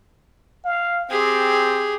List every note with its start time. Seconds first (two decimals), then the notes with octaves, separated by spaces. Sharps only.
0.65 F5
1.09 C4 G4 G#4